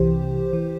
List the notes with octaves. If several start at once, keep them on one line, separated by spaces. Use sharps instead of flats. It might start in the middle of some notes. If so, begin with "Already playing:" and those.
Already playing: C2 C3 E3 G4 C5
E3